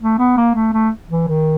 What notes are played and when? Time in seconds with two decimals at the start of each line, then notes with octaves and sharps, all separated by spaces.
0.02 A3
0.19 B3
0.37 A#3
0.55 A3
0.73 A3
1.10 E3
1.28 D#3